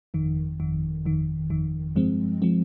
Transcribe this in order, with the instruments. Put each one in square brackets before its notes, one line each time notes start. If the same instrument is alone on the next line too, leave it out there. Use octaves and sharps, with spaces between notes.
[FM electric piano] G1 F2 D#3
G1 F2 D#3
G1 F2 D#3
G1 F2 D#3
G2 F3 G#3 C4
F3 G#3 C4